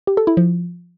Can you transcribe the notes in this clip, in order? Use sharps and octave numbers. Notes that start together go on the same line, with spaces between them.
G4
A4
E4
F3